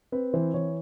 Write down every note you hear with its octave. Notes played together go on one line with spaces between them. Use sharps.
C4 B4
E3 C5
E3 C#5